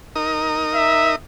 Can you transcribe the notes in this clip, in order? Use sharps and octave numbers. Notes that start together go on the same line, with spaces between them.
D#4 A#4 D#6
E5